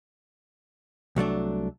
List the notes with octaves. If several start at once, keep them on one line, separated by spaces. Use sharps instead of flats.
C2 F#3 A3 D4